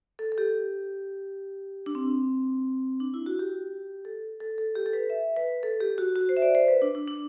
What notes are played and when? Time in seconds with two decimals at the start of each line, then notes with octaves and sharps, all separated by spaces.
0.19 A4
0.32 A4
0.38 G4
1.86 D4
1.95 C4
3.00 D4
3.14 E4
3.26 F#4
3.39 G4
4.05 A4
4.40 A4
4.58 A4
4.75 G4
4.86 A4
4.93 B4
5.10 E5
5.37 B4
5.63 A4
5.80 G4
5.98 F#4
6.16 F#4
6.29 C5
6.37 E5
6.42 D5
6.55 C5
6.68 B4
6.82 D4
6.95 D4
7.08 D4